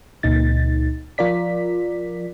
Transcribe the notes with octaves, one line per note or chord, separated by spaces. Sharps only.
C#2 A#2 D#4 A6
F3 F4 A#4 D5 B6